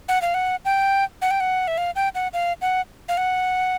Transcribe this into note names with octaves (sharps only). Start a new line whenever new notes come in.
F#5
F5
F#5
G5
F#5
G5
F#5
E5
F5
G5
F#5
F5
F#5
F5
F#5